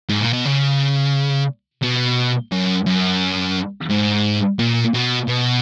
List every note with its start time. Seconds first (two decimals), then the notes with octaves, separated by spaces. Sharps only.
0.09 G#2
0.21 A#2
0.33 B2
0.45 C#3
1.82 B2
2.52 F#2
2.87 F#2
3.89 G#2
4.59 A#2
4.94 B2
5.28 B2